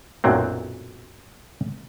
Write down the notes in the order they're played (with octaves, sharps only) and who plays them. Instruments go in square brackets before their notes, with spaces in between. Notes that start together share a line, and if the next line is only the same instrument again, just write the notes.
[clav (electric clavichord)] B1 F#2 A#2 F#3 C4